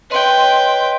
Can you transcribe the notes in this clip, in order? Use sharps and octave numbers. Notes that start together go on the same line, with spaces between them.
B4 C#5 D#5 G5 C6